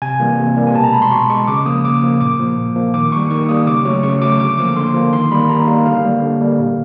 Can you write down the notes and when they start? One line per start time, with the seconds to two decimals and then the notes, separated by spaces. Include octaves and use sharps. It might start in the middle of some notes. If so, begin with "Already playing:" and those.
0.02 C3 G#5
0.20 E3 G3 A#3
0.38 C3
0.57 E3 G3 A#3
0.67 G#5
0.75 B2 A5
0.84 A#5
0.93 G#3 B5
1.02 C6
1.11 B2 C#6
1.30 G#3 C#6
1.47 C#3 D6
1.66 F3 A#3 D#6
1.85 C#3 D6
2.03 F3 A#3
2.21 A#2 D6
2.40 F3 A#3
2.57 A#2
2.76 F3 A#3
2.94 D#3 D6
3.12 G3 A#3 C#6
3.31 D#3 C#6
3.49 G3 A#3 D#6
3.67 C#3 D6
3.85 F#3 A3 C#6
4.03 C#3 C#6
4.22 F#3 A3 D6
4.40 D3 D6
4.58 F3 A#3 D6
4.76 D3 C6
4.94 F3 A#3
5.13 D#3 C6
5.31 G3 A#3 B5
5.49 D#3 A#5
5.67 G3 A#3 F5
5.86 D3 F5
6.05 G3 A#3
6.22 D3
6.41 G3 A#3
6.59 A#2